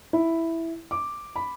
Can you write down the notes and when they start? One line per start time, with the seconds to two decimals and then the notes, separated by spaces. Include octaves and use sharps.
0.13 E4
0.91 D6
1.36 B5